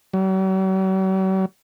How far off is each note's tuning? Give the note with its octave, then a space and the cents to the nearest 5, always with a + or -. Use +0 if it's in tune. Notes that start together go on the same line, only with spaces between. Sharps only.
F#3 +45